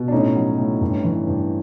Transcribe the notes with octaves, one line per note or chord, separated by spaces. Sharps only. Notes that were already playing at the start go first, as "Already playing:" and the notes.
Already playing: B2
D4
A2 C#4 D#4
F#3
A2
G2
E3
G2